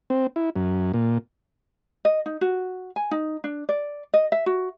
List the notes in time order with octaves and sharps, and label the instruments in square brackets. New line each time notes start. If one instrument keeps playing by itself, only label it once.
[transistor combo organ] C4
E4
F#2
A#2
[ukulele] D#5
D#4
F#4
G#5
D#4
D4
D5
D#5
E5
F#4